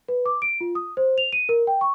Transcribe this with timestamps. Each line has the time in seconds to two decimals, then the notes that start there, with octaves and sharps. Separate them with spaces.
0.08 B4
0.26 D6
0.42 D7
0.61 F4
0.75 D#6
0.97 C5
1.18 F7
1.33 D#7
1.49 A#4
1.67 G5
1.81 C#6